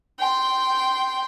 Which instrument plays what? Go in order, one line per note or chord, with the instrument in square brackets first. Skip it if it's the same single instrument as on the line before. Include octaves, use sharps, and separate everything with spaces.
[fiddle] G5 C6